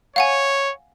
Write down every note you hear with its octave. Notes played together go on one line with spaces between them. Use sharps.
C#5 F5 F#5 G#5